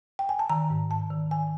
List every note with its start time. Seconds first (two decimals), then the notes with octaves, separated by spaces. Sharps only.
0.19 G5
0.29 G#5
0.39 A5
0.50 D#3 A#5
0.70 G#2
0.90 G#2 A5
1.11 D#3
1.31 D#3 G#5